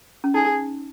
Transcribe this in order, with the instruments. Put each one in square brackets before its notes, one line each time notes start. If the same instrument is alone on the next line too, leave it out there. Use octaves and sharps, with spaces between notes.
[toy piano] C#4
[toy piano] D#4 [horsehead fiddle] G#4